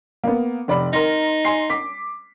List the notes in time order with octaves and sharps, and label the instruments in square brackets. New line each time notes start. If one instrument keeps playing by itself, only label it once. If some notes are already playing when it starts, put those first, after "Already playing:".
[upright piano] A#3 B3
F1 D5 B5
[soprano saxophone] D#4 [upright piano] A#4 C6 A#6
[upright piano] G#5 C6 C7
D6 B6